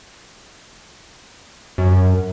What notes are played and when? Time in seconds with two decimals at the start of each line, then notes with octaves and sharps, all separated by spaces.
1.78 F#2